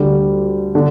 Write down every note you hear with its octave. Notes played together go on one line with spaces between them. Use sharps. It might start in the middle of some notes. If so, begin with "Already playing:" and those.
Already playing: D2 D3 G3
D3